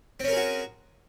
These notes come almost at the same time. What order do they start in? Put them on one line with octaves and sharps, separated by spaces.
C4 C#4 A#4 G#4 F#4